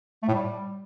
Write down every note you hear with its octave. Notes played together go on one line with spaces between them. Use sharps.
A3
A2
G3